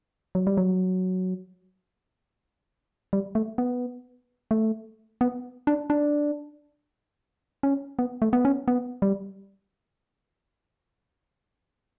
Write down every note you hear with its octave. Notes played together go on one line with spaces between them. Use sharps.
F#3
G3
F#3
G3
A3
B3
A3
B3
D4
D4
C#4
B3
A3
B3
C#4
B3
G3